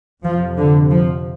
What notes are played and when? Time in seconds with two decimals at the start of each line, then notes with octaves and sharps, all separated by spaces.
0.23 F2 C3 F3
0.57 D3
0.91 F3